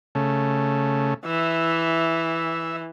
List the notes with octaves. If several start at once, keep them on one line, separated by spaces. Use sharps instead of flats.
C#3 A3
E3 E5